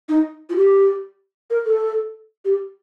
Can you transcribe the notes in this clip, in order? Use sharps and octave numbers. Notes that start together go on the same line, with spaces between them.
D#4
F4
G4
A#4
A4
G4